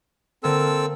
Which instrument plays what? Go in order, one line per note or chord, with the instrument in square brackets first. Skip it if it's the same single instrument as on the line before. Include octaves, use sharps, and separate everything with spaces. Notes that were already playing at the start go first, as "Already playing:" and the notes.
[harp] D3 A#3 A#4 [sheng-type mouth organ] C4 A4 E6